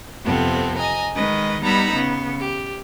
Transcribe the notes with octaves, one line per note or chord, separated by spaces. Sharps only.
F2 C3 B3 C4 A4
D#5 G#5 A#5
D#3 G#3 B4 D#5
G3 B3 D#4 A#5 B5 E6
C#3 B3
G4